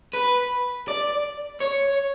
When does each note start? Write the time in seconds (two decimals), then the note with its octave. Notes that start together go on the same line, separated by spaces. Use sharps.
0.13 B4
0.88 D5
1.61 C#5